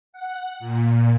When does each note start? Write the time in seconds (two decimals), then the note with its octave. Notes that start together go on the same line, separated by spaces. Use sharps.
0.13 F#5
0.60 A#2